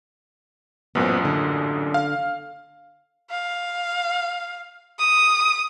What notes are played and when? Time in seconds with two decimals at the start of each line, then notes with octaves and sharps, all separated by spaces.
0.95 A1 F#2 A#2 B3 C5
1.25 D3
1.94 F5
3.30 F5
4.99 D#6